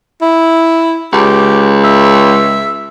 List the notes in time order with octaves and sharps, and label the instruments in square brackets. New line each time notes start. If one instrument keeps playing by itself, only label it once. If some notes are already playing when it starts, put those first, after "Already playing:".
[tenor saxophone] E4
[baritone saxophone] C#2 [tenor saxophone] G4
[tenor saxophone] E5